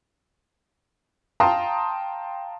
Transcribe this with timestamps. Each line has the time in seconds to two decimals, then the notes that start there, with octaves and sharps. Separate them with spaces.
1.40 F5 G5 A5 A#5 C6 D#6